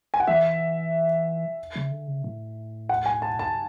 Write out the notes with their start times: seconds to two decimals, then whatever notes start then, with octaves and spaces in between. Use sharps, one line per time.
0.14 G#5
0.20 F#5
0.27 E3 E5
1.76 C#3
1.91 D3
2.08 C#3
2.24 A2
2.89 F#5
3.06 G#5
3.22 A5
3.39 A5